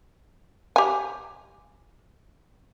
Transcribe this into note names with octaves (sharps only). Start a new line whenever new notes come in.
G4 G#5